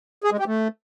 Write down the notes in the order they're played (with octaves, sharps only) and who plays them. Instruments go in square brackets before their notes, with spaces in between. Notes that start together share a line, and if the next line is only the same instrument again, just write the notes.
[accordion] G#4
G#3
G4
A3